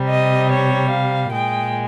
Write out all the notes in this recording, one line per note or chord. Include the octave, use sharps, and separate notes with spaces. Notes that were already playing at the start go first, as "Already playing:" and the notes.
Already playing: C3 G3
D#5
C#5
F5
A#2 G#3 G5